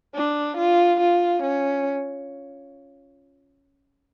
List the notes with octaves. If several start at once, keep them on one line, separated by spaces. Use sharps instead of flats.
D4
F4
F4
C#4